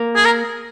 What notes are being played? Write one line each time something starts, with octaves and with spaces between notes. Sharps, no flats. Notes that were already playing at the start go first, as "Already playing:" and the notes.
Already playing: A#3
G#4
A#4